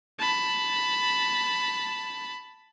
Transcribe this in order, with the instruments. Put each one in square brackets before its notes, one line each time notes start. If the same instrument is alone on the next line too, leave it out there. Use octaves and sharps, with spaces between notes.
[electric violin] A5 B5